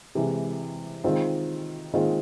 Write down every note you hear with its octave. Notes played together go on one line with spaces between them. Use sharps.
C3 E3 G#3
D#3 G#3 C4 F4
D#3 G#3 C4 F4